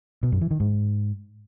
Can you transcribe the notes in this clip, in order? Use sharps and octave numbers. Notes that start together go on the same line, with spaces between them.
B2
F#2
E3
D#3
G#2